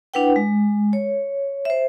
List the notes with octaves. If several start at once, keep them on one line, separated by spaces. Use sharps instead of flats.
D4 E4 B4 F#5 G5
G#3
C#5
C5 E5